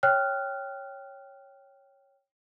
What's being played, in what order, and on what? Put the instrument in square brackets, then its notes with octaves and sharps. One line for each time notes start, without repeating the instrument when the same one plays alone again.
[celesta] C#5 G5 F6 F#6